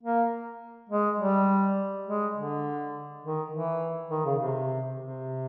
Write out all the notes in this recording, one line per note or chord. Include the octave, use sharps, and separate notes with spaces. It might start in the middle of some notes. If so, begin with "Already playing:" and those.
A#3
G#3
G3
G#3
D3
D#3
E3
D#3
C#3
C3
C3